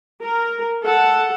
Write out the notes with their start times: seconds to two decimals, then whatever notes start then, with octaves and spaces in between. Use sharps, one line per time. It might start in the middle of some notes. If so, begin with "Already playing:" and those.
0.23 A#4
0.85 A4 F#5